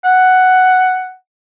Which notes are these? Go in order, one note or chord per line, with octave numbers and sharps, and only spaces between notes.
F#5